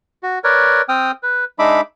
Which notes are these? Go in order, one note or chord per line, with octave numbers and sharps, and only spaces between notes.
F#4
A#4 B4 C#5 D5
C4 G5 D#6 F6
B4
G#3 D4 D#4 E5 B5 D6